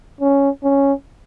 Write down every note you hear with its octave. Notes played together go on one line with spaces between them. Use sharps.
C#4
C#4